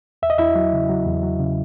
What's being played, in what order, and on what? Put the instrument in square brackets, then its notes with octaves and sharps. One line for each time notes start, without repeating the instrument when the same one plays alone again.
[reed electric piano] E2 E5
D#5
E2 E4 E5
F#3
C#3
F#3
E2
F#3
C#3